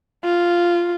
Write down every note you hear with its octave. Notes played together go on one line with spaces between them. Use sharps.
F4